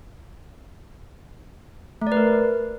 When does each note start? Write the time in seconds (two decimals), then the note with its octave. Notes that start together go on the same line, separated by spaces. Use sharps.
2.02 A3
2.07 D5
2.12 B4
2.17 A#4